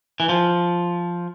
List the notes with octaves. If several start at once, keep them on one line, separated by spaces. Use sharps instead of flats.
E3
F3